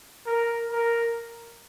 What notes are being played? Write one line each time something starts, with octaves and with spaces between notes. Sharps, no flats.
A#4
A#4